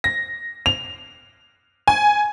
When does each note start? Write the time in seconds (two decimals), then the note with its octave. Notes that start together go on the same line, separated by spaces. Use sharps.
0.04 A#6
0.66 F7
1.88 G#5